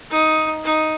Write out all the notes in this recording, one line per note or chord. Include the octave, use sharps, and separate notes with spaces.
D#4
D#4